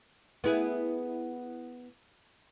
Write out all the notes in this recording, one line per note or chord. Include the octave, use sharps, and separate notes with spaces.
B3 E4 G#4